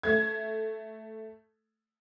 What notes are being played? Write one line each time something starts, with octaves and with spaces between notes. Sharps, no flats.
A3 G#6